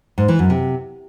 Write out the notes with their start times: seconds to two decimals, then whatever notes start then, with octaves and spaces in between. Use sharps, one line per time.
0.18 G#2
0.28 E3
0.39 F#2
0.50 C3